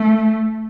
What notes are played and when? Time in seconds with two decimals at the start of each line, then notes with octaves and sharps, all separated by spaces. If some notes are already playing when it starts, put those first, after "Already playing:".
Already playing: A3